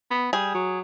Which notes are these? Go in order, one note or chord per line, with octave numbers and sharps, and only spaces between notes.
B3
G3 G#4
F#3